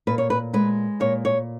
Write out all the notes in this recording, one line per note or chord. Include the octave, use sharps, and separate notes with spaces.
A#2 B4
C#5
B4
G#3 B4
A#2 C#5
C#5